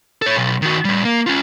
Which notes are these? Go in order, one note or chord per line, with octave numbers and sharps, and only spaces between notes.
A4 C#5
B1
D#3 F#4
A2 G3
A#3
C#4 F4